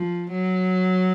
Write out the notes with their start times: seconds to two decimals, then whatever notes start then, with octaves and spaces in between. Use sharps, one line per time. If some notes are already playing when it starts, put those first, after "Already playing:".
Already playing: F3
0.31 F#3